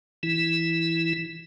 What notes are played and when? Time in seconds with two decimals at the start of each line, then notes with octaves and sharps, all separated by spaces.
0.23 E3 E4